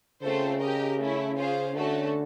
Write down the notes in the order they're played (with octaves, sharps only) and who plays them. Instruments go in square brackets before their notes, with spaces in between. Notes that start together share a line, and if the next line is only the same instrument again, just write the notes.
[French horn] C#3 [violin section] A3 C4 F4 A4 C5
[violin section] G4 A#4 D#5
A3 C#4 E4
C#4 F4 G#4 C5 F5
[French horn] D3 [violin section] A3 C#4 F#4 A4